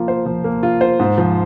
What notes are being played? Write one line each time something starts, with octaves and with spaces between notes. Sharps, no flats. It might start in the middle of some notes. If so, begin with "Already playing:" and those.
Already playing: F3 A#3 F4
C5
F3
A#3
F4
C5
G#2
F3